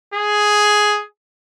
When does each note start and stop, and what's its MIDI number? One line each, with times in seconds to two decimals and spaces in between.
0.14 1.01 68